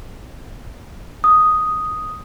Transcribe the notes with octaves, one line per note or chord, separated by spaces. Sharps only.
D#6